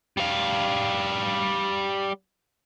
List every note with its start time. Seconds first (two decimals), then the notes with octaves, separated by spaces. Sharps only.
0.17 G3 F5